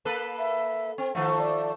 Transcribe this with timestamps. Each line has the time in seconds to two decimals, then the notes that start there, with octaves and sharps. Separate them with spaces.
0.05 A#3 A4 B4
0.39 E5
0.98 C4
1.15 D#3 F3 A3 F#5
1.39 D5